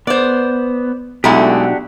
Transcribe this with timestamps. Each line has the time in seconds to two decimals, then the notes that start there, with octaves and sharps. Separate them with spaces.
0.07 B3 C5 D5
1.24 B1 G#3 A3 D4 E4 F#4 G4